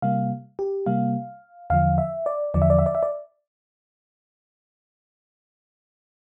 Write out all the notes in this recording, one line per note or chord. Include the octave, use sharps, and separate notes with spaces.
C3 G3 A#3 F5
G4
C3 G3 A#3 F5
E2 D3 F3 F5
E5
D5
E2 D3 F3 D5
E5
D5
E5
D5
E5
D5